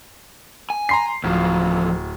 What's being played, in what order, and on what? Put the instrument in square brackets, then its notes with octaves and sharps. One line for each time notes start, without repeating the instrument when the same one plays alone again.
[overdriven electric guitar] G#5
[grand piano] A#5 C6 C7
[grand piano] D1 [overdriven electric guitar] E2 F3